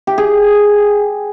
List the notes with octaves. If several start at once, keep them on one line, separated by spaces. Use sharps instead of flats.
G4
G#4